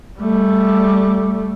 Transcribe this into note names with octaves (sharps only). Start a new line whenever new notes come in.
G3 A3